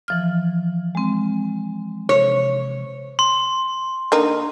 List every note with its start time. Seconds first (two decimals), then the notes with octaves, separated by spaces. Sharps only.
0.08 E3 F3 F6
0.95 G#3 C4
2.09 C3 C#5
3.19 C6
4.12 D3 A#3 D#4